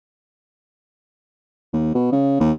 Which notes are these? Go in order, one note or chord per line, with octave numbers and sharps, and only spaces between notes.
D#2
B2
C#3
D#2